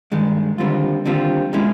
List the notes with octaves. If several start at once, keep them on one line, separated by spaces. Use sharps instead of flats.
G2 D#3 G#3
D#2 D3 G3 C4 F4
D#2 D3 G3 C4 F4
B2 G#3 C#4 E4